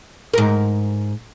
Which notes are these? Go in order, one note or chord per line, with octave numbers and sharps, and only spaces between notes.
G#2 A#4